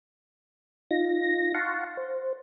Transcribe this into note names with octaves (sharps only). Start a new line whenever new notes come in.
D#4 F4 A#6
F5 F#5 A5 C6 C#6
C5